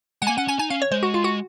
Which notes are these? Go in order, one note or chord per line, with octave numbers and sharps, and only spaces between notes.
G#3 F#5
A#3 G#5
C#4 F#5
C#4 G#5
D#4 G#5
C#4 F5
C#5
G#3 C5
F#4
F4
F#4